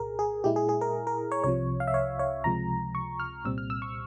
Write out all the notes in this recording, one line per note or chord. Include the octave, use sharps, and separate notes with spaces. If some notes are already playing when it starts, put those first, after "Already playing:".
Already playing: C2 A#2 G#4 A#4
G#4
A#2 G#3 E4 G4
G#4
G#4
A#4
A#4
C#5
C2 C3 F3 C#5
F5
E5
C#5
C#5
C#2 C3 F3 G#3 A#5
C#6
F6
C2 A#2 G3 C4 E6
F6
E6
C#6